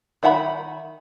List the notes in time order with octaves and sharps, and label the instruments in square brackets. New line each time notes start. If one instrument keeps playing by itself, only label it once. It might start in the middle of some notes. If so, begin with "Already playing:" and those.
[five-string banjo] D#3 E5 F#5 A#5 B5